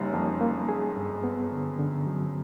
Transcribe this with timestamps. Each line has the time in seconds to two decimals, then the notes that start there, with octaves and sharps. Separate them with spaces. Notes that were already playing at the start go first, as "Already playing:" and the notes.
Already playing: F#1 F#2 G3 A#3 D#4
0.13 F2 A#3
0.41 A#3
0.69 G#4
0.97 G2
1.24 B3
1.52 D3
1.79 D3
2.07 F#3